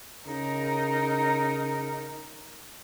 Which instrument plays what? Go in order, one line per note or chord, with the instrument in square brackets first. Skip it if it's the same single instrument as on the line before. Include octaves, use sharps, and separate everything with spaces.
[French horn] C#3 [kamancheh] D#4 A#4